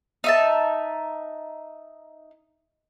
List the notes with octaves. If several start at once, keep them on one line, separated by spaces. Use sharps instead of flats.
D#4 E5 A5